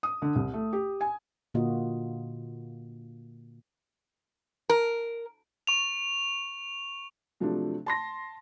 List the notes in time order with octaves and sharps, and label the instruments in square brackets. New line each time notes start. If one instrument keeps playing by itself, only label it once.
[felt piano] D#6
D3
C2
A3
G4
G#5
[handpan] A#2 D3 A#3 F4 F#4 D#5
[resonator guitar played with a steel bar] A#4
[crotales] C#6 F7
[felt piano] C3 F3 F#3 A3 D4
A5 C6 A#6